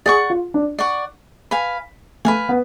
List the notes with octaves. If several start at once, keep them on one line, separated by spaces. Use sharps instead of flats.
G#4 D5 F#5 C#6
F4
D4
D5 F#5 C#6
B4 F5 G#5
A3 B4 F5 G#5
B3